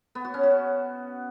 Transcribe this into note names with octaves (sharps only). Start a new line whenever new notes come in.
B3
F#4
C#4
F#4